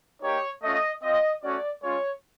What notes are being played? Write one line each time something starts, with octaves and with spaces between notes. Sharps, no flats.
A#3 D#4 G4 C#5
A3 C#4 F4 D#5
C4 F4 D#5
A3 C#4 F#4 D5
G#3 C#4 F4 C#5